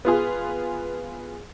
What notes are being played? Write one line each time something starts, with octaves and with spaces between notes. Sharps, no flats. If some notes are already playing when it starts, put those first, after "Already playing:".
B3 F4 G#4